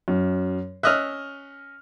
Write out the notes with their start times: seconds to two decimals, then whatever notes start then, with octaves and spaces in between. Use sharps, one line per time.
0.08 F#2
0.83 C#4 D#5 E5 F6 F#6